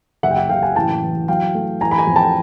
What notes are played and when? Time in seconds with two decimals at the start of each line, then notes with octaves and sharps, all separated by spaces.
0.23 F#1 E5 F#5
0.31 G5
0.36 E5 F#5
0.49 F#1 F5 G5
0.62 F#5 G#5
0.75 A1 G5 A5
1.02 E3
1.28 F#3 F5 G5
1.55 A3
1.81 E3 G#5 A#5
1.91 B5
1.98 G#5 A#5
2.07 F2
2.16 G5 A5